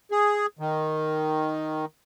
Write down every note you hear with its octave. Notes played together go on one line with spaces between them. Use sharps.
G#4
D#3